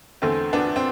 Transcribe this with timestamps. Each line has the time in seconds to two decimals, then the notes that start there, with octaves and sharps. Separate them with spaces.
0.22 E2 D3 A3 C4
0.53 B3 D4
0.76 C4